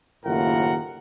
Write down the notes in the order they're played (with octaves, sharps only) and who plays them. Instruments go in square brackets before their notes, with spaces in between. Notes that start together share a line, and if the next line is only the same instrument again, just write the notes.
[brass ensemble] F#1 D#2 A2 F4 A#4 F#5